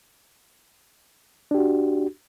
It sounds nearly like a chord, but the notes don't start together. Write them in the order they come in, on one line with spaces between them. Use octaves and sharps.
D4 G4 F#4